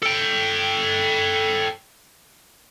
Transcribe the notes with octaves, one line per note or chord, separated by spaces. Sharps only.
A4 G5